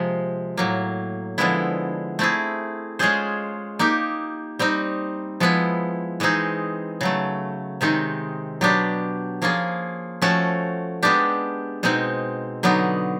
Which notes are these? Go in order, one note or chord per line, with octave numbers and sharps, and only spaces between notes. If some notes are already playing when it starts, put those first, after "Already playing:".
Already playing: C3 F3 G#3
A2 F#3 A#3
D3 F3 G#3 B3 E4
A3 C4 E4 G#4
G#3 C#4 F4 G#4 C5
A#3 D#4 G4
G3 C4 D#4
F3 G#3 B3 E4
E3 G#3 C4 D#4 G#4
C#3 F#3 A3
C3 D#3 G#3 C4 D#4
B2 F#3 B3 D4 G4
F3 A#3 C#4 F4 G#4
F3 A3 C#4 F#4 A4
G#3 B3 D4 G4
B2 G#3 C4 D#4
D3 F#3 B3 D#4